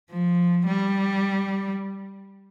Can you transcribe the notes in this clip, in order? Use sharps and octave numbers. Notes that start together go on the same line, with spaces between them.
F3
G3